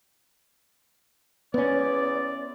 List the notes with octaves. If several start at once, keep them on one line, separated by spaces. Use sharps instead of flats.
E2 B3 C#4 D5